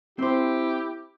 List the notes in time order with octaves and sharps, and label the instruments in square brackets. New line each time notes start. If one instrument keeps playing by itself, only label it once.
[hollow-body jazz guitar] C4 C5 [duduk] E4 [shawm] G4